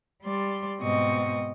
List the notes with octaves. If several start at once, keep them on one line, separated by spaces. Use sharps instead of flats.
G3 D5 C6
G#2 B2 C4 D#5 C#6